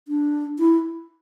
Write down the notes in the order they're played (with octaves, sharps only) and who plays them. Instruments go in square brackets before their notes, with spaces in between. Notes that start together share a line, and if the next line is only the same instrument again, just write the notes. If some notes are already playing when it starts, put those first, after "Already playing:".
[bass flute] D4
E4